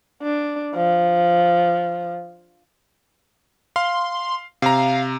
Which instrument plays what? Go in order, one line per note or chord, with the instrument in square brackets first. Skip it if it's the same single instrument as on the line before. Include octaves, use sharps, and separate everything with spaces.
[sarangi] D4
F3
[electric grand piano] F5 [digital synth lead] C6
[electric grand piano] C3 A#5 [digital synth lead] F5